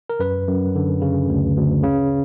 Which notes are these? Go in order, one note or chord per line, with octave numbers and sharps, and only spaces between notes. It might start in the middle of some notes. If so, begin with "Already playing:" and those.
A#4
F#2 B4
F#2
D3
C#3
D2
D2
C#3